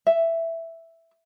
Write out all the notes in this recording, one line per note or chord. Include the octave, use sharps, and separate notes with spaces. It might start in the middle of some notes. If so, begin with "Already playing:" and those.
E5